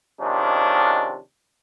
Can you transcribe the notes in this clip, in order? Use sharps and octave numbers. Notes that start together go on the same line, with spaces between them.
C3 D#3 F3 G#3 C#4 D4